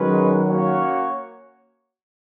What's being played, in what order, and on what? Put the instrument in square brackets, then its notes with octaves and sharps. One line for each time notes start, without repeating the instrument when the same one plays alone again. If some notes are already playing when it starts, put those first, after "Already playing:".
Already playing: [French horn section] D#3 F#3 [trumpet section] G#3 C#4 G#4 B4
[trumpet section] A#3 C#4 F#4 C#5